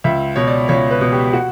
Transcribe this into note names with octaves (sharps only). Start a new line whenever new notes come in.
C#2 E5
B2 C#5
D5
C#2 C#5
B4
B2
G4
F#4